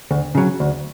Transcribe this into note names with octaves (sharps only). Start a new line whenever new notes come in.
D2
C#3 F#3
D2